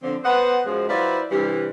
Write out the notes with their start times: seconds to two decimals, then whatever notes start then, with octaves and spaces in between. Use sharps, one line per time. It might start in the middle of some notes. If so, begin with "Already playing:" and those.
0.02 D3 F3 C4
0.23 B3 B4 C5 D#5 F#5
0.66 F#2 F3 G#3
0.89 F#3 E4 F4 B4 C5 D5
1.31 G2 C3 E3 G3